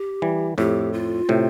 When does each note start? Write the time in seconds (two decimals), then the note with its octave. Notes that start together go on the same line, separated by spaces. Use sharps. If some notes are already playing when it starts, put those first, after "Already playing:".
Already playing: G4
0.22 E3 G3
0.58 F2 A2 G4
0.93 F4
1.29 A2 C3